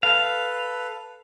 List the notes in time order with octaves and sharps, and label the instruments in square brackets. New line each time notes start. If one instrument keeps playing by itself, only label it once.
[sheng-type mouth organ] A4 B4 [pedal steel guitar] F5